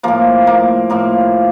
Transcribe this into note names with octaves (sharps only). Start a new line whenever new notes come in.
A2 F3 A#3
A#3
A2 F3 A#3